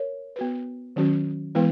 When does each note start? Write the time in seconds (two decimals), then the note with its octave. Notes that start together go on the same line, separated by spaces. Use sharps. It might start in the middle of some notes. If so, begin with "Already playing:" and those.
Already playing: A#4 C#5
0.36 B3 F#4 B4
0.96 D#3 F#3 C#4 F#4
1.55 E3 G#3 B3 E4 B4